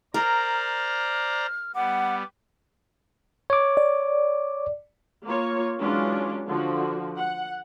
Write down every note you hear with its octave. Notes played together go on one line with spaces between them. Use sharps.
A#4 C5 D5 A#5
F6
G3 B3 F#5 D6
C#5 D6
D5
A#3 F4 C#5
E3 F#3 G#3 C#4 D4 F4
D3 F3 F#4
F#5